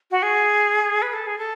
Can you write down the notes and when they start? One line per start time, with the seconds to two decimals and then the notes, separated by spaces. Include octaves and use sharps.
0.11 F#4
0.23 G#4
1.02 B4
1.14 A4
1.27 G#4
1.38 A4